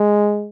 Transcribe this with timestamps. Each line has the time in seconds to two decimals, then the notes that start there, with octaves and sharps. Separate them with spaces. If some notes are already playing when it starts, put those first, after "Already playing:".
Already playing: G#3